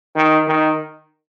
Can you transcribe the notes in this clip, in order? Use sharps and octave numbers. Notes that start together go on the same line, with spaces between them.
D#3
D#3